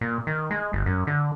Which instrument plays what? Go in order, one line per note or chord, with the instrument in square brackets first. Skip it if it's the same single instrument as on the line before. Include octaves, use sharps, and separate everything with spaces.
[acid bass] A#2
D#3
G#3
G1
F#2
D3